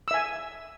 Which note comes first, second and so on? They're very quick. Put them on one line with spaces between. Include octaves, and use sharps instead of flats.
E6 E5 G#5